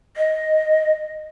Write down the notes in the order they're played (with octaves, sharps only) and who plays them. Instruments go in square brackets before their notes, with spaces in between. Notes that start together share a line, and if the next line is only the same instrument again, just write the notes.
[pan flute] D#5